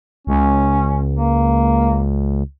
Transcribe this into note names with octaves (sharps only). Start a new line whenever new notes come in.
C#2 C#4
A#3